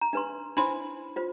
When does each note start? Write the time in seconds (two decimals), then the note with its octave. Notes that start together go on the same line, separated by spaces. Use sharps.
0.01 A#5
0.13 D4 B4 C6
0.57 D4 E4 C5 B5 C6
1.16 F4 C5